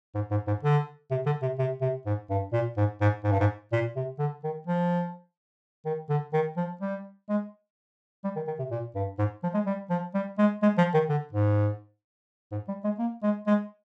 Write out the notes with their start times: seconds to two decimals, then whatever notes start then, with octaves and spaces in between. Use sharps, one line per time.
0.15 G#2
0.31 G#2
0.47 G#2
0.63 D3
1.11 C3
1.26 D3
1.42 C3
1.58 C3
1.81 C3
2.06 G#2
2.30 G2
2.53 A#2
2.77 G#2
3.01 G#2
3.24 G#2
3.32 G2
3.40 G#2
3.72 A#2
3.96 C3
4.19 D3
4.44 D#3
4.67 F3
5.85 D#3
6.09 D3
6.33 D#3
6.57 F3
6.81 G3
7.29 G#3
8.24 G3
8.36 D#3
8.47 D#3
8.59 C3
8.71 A#2
8.95 G2
9.19 G#2
9.43 F3
9.54 G#3
9.66 G3
9.90 F3
10.14 G3
10.38 G#3
10.62 G#3
10.78 F3
10.94 D#3
11.09 D3
11.33 G#2
12.52 G#2
12.68 G3
12.84 G#3
12.99 A#3
13.23 G#3
13.47 G#3